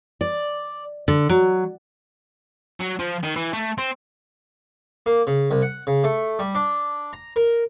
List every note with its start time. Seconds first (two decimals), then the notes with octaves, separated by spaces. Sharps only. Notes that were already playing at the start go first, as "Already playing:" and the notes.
0.21 D5
1.08 D3
1.29 F#3
2.80 F#3
2.99 F3
3.23 D#3
3.36 E3
3.53 A3
3.78 C4
5.06 A#3
5.27 C#3
5.51 C2
5.62 F#5
5.87 C#3
6.04 A3
6.39 G3
6.55 D4
7.13 A#5
7.36 A#4